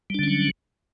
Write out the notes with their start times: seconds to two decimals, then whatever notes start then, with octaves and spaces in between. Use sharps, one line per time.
0.10 G3
0.14 D4
0.19 D3
0.23 C#4
0.28 F#3